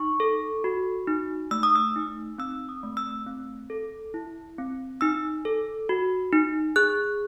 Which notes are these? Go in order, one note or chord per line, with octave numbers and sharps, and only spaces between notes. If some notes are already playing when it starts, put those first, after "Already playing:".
Already playing: D#4 C#6
A4
F#4
D#4
A3 E6
D#6
E6
D#4
C4 E6
D#6
A3
E6
C4
A4
E4
C4
D#4 E6
A4
F#4
D#4
G#4 F#6